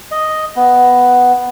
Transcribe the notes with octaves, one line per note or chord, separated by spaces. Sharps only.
D#5
B3